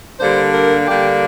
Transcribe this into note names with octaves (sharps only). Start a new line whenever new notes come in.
D3 G3 A#3 D4 C5
A#4
D3 G3 A#3 D4 G4